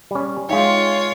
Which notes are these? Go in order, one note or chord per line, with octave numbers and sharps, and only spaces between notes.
G3 C#4
G#3 D#4 F4 C#5 E5 F5 G5